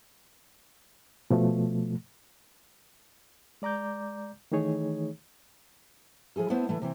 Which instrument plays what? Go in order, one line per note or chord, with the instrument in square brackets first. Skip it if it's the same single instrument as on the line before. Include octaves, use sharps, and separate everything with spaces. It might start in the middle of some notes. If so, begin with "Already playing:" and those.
[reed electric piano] B2 F3 A3
G#3 D5 A#5 D6 G6
D#3 E3 A3 D#4 G#4 C#5
[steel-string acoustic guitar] F3 E4 G#4 A4
A3 B3 E4 C5 F#5 A5
D3 E3 A3
C3 E3 C4